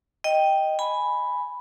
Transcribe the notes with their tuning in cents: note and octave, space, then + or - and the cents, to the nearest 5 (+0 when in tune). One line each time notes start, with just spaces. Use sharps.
D#5 +0 G5 +0
G#5 +0 B5 +0